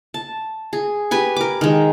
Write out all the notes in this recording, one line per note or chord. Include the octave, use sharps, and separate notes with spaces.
A5
G#4
G4 B4 G#5
A#4 D6
D#3 G#3